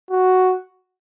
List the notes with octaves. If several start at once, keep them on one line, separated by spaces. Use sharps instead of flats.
F#4